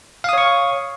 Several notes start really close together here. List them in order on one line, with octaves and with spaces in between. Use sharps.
F5 D#6 C#5 C#6